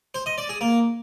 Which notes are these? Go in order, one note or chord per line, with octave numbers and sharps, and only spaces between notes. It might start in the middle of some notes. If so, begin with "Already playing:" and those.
C5
D#5
D5
G#4
A#3